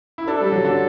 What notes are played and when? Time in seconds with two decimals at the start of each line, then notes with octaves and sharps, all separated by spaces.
0.18 E4
0.28 D4 A4
0.40 G3
0.52 F#3
0.64 D3